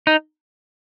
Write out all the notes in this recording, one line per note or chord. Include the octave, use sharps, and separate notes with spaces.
D#4